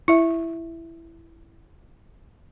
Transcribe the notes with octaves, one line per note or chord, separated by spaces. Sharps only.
E4 E5